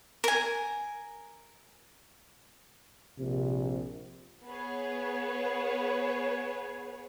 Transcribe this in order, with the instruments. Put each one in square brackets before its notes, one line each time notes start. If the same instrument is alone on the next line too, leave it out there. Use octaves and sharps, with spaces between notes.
[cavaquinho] A#4 G#5
[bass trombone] A#1 [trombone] C3
[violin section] B3 G#4 B4 C#5